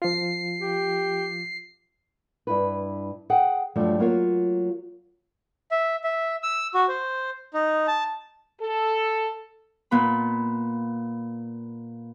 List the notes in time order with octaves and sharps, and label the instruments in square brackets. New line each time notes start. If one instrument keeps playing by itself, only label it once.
[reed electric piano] F3 F4 [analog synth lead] C7
[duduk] G4
[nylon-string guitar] G2 E4 B4
G#4 F#5 G5
G2 F3 F#3 A3
F#3 A#3 F4 C#5
[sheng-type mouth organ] E5
E5
E6
F#4
C5
D#4
A5
[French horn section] A4
[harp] A#2 B3 B4 B5